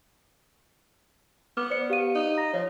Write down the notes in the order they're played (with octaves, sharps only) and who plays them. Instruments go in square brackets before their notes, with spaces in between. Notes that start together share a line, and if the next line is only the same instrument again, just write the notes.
[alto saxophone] B3 [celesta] D6 F6
[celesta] C5 D5 C#7
G4 F5 D#7
[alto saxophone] D#4
[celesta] A#5 A#6
[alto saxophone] F3 [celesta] C#5